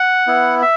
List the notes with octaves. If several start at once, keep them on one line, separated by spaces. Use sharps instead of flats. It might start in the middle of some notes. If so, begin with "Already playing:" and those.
Already playing: F#5
B3 E4
E5